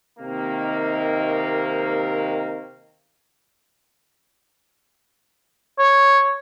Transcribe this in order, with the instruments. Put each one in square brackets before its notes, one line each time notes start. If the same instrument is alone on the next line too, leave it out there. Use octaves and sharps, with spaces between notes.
[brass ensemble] C3 D#3 A#3
[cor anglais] C#5